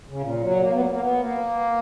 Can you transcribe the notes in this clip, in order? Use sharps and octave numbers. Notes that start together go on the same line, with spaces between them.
C#3
A#2
F#3
A#3
B3
A#3
A#3
B3
A#3